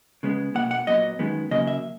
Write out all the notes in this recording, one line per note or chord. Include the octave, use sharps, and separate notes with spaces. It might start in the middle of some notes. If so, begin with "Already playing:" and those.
C#3 G#3 B3
B2 F#3 A#3 F#5
F#5
A#2 F#3 B3 D#5
F#2 D#3 G#3 B3
C#3 F#3 A#3 D#5
E5